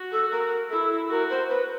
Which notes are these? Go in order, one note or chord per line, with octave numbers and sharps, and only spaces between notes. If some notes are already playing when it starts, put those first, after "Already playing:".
Already playing: F#4
A4
A#4
E4 A4
F#4 A#4
C5
B4